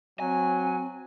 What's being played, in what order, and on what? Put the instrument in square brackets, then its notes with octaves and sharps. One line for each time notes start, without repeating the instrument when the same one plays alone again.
[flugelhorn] F#3 [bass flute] C4 [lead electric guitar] G#5